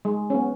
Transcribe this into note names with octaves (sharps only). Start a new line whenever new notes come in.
G#3
C#4
B3